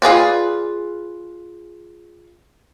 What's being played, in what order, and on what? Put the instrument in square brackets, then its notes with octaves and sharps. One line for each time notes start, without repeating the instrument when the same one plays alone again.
[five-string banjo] F4 G#4 B4 D5